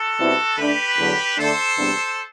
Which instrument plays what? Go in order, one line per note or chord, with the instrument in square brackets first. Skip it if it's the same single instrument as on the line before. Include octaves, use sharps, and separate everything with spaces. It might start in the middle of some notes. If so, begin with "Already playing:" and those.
Already playing: [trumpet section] F#4 A4
[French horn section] B2 G3 C4 E4
[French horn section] D3 A3 D4 [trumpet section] G4 B4
[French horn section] E2 D3 F#3
[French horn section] D3 A3 D4 [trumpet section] A4 C5
[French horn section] E2 C3 G3 B3 D4